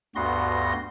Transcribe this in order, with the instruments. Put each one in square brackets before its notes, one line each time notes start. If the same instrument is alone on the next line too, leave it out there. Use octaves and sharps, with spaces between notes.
[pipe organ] D2 G2 B3 F#4 C6 A#6